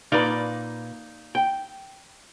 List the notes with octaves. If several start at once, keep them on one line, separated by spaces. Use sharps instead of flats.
A#2 A#3 D#4 B4 D5
G5